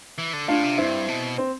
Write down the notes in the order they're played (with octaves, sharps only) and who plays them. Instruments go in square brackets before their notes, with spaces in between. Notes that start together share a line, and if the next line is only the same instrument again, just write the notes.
[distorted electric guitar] E3
D3
[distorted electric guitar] A2 [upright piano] D4 F4
[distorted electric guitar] C3
[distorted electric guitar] G2 [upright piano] C4 E4
[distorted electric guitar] B2
[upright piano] C4